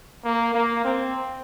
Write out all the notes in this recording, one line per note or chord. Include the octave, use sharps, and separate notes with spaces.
A#3
A#3
C4